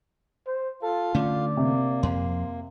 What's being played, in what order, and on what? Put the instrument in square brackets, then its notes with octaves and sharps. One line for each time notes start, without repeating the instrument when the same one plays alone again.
[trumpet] C5
[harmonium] F4 F5 [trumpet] A4
[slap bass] D3 A3 C#4 [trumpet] D5
[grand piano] C3 [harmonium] A#3
[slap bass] F2 [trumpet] C6